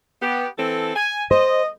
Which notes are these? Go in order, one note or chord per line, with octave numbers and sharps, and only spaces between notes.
B3 G4
E3 C4 A4
G#5
C5 D#5